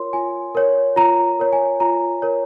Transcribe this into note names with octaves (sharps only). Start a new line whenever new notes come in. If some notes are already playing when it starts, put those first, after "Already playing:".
Already playing: F4 A#4 C#5 C6
F4 G#5
A#4 C#5
F4 A#5
A#4 C#5
G#5
F4 A#5
A#4 C#5